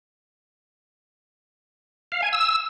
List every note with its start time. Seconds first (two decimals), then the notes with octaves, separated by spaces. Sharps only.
2.12 F5
2.22 G#5
2.33 E6